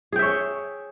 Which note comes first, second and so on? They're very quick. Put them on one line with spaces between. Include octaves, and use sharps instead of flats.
G#4 G5 E5 C#5